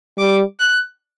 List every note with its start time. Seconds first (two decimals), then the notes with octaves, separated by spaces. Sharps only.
0.18 G3 D6
0.60 F#6